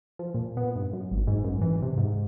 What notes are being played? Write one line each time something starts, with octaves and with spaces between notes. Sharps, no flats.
F3
A#2
B3
G2
F#2
G#1
G#2
F#2
E3
C3
G#2